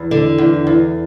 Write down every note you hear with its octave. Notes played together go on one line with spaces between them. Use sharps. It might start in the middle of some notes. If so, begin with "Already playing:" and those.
Already playing: E2
D3
E2
E2